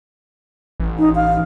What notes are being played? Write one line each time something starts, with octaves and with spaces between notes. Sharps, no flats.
A1
D#4
F5